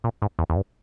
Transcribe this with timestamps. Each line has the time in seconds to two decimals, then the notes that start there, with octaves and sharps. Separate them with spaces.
0.04 A#2
0.22 G#2
0.39 E2
0.50 E2
0.56 G2